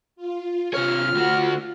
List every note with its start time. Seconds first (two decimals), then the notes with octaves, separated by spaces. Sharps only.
0.16 F4
0.74 C3 C#5 F6
1.15 D2 F#4